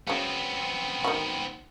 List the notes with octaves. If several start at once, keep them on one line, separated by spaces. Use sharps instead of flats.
C#3 F#3 B3 C4
D#3 F#4